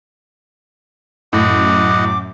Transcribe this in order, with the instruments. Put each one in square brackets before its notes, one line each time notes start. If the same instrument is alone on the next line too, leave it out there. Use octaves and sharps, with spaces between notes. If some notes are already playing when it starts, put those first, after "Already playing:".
[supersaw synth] F#2 [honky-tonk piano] A2 [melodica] D#5 F#5 [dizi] D6